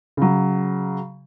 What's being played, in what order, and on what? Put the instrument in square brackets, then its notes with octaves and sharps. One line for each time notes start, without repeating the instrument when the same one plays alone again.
[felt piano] C#3 F#3